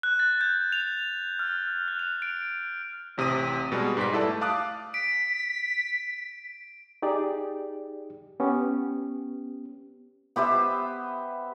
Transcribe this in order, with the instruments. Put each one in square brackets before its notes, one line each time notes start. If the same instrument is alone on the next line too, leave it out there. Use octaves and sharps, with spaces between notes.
[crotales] F#6
A6
G6
F7
F6
F#6
F7
D7
[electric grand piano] A1 C3 D#6 D#7
B2 G3 G#3
G#2 G3 B4 B6
E4 A4 D5 A5
A3
F5 A5 D6 D#6 F#6
[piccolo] B6 [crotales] D7
[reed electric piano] D#4 G4 G#4 D5
B3 C#4 G4
[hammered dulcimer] B3 G4 C5 E5